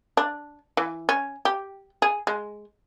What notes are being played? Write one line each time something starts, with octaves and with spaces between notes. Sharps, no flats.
D4
E3
C#4
G4
G#4
G#3